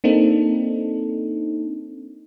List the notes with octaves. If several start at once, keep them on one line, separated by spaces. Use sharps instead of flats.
A#3 C4 D4 D#4 A4